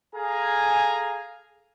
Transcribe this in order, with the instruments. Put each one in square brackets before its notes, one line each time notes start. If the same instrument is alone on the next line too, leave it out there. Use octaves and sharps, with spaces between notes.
[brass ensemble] G#4 A4 F5 G#5 A#5